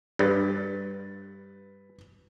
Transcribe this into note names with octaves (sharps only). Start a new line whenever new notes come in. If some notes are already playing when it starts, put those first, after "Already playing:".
G2 B4 A6